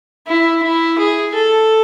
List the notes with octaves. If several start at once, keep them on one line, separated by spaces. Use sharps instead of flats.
E4
E4
G#4
A4